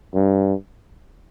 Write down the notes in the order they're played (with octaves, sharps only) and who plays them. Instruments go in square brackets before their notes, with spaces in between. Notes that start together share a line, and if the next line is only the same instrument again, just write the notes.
[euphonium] G2